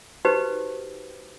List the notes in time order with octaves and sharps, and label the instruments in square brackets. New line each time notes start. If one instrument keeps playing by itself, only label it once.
[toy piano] D#4 F#4 G4 B4 C5